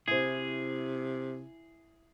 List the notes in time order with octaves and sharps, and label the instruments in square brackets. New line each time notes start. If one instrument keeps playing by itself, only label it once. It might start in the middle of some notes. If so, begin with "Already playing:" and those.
[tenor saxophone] C3 [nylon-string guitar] E4 C5 [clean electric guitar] G#4